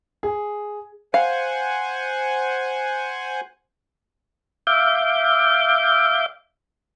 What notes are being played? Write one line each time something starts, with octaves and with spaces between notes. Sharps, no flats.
G#4
C5 F5 F#5 G#5
E5 F5 D6 G6